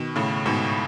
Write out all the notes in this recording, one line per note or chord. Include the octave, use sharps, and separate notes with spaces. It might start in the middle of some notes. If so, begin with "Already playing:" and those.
Already playing: B2 D#3
A2 C#3
G#2 B2